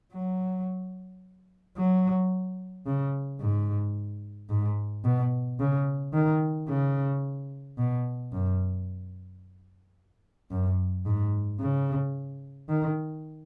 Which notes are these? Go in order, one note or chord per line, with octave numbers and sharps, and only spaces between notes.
F#3
F#3
C#3
G#2
G#2
B2
C#3
D#3
C#3
B2
F#2
F#2
G#2
C#3
D#3